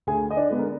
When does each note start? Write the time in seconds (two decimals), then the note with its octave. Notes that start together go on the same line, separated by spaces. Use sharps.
0.07 D2 G#4 G#5
0.31 D#5
0.37 D4 D5
0.50 D3 G#3 B3
0.59 A#4